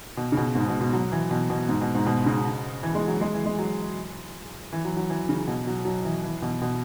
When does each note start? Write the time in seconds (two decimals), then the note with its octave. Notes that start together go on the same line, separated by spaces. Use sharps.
0.17 B2
0.32 C#3
0.37 B2
0.55 G#2
0.68 B2
0.81 B2
0.93 F#3
1.12 E3
1.31 B2
1.50 B2
1.69 G#2
1.81 B2
1.95 G#2
2.06 B2
2.26 C#3
2.83 E3
2.95 G#3
3.08 F#3
3.21 G#3
3.34 E3
3.46 G#3
3.59 F#3
4.73 E3
4.85 F#3
4.97 F#3
5.10 E3
5.29 C#3
5.48 B2
5.67 F#3
5.85 F#3
6.05 E3
6.24 E3
6.42 B2
6.62 B2